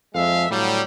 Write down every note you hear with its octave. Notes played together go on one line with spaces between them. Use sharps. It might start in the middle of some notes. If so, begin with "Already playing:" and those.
F2 G#3 A4 E5 F5
A2 D3 F#3 G3